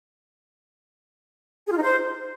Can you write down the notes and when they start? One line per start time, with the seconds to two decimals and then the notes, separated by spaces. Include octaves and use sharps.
1.66 G#4
1.72 F4
1.77 D#4
1.83 C5